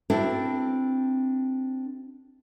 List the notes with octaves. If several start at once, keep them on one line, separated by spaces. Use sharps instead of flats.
C4 D4 E4 F#4 A4